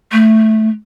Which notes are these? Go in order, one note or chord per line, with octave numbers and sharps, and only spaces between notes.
A3